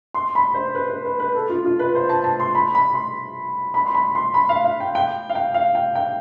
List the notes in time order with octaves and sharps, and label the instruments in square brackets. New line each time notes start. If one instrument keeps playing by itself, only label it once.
[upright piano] C6
B5
C5
B4
B4
B4
B4
A4
F4
F4
B4
C5
A5
A5
C6
B5
B5
C6
B5
C6
B5
C6
B5
F5
F5
G5
G5
F5
G5
F5
G5
G5